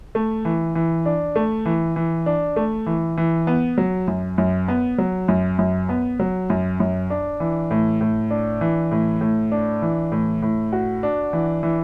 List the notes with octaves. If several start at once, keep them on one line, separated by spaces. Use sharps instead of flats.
A3
E3
E3
D4
A3
E3
E3
D4
A3
E3
E3
B3
F#3
F#2
F#2
B3
F#3
F#2
F#2
B3
F#3
F#2
F#2
D4
E3
A2
A2
D4
E3
A2
A2
D4
E3
A2
A2
F#4
D4
E3
E3